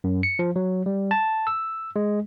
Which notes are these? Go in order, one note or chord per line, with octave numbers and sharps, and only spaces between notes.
F#2
C#7
F3
F#3
G3
A5
E6
G#3